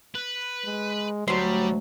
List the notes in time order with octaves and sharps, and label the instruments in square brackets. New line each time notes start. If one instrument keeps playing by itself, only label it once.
[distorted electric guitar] B4
[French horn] G#3
[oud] D2 C5 [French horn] F#3 [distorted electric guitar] G3